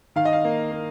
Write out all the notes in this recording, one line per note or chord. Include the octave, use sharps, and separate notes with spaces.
D#3 F5
D#5
F5
A#3
A#3